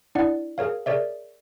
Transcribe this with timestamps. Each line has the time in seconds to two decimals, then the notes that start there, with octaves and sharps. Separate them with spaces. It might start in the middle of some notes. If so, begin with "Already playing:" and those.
0.15 D4 E4 D5 F#5
0.58 G#4 A#4 C#5 F5
0.86 G#4 A#4 C#5 D5 E5